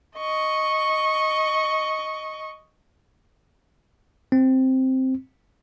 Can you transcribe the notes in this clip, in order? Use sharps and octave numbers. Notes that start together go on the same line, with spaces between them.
D#5 C#6
C4